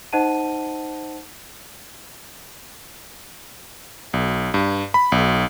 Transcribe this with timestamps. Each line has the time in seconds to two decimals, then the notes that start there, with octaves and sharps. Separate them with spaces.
0.12 D#4 C5 D#5 F#5 A5 D#7
4.14 B1
4.54 G2
4.94 B5
5.12 B1